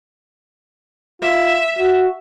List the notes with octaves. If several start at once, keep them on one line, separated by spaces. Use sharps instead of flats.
F4 E5
F#4